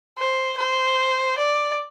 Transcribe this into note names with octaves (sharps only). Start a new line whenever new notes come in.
C5
C5
D5